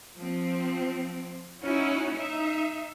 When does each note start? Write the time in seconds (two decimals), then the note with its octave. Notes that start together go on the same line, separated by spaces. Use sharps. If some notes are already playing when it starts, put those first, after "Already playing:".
0.19 F3 C4
1.61 C#4 D#4 E4 F#4
2.15 D#4 E5